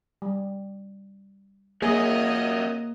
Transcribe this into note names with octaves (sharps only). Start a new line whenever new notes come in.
G3
A#3 G#4 A#4 C#5 D#5 E5